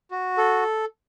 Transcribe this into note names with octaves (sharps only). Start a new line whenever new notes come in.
F#4
A4